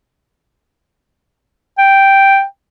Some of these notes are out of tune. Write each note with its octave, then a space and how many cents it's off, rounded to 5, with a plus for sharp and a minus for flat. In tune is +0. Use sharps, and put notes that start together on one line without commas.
G5 +0